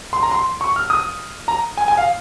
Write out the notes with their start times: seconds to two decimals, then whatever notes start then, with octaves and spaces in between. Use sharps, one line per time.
0.13 C6
0.23 A#5
0.31 C6
0.61 C#6
0.76 F6
0.90 D#6
1.48 A#5
1.77 G#5
1.88 G#5
1.98 F5